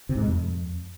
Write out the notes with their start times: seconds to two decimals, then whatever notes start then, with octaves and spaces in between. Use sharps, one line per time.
0.09 C3
0.15 G#2
0.22 G#3
0.28 F2